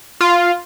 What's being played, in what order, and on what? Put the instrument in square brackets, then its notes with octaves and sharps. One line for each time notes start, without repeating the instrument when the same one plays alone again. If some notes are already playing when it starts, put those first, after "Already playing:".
[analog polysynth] F4